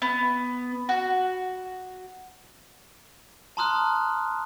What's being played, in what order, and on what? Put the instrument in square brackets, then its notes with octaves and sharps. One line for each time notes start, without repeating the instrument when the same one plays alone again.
[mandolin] B3
F#4
[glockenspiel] A5 A#5 C6 D#6 F6 F#6